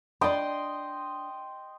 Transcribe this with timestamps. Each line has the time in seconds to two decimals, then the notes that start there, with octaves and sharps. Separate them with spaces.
0.21 D4 D5 D#5 G5 C6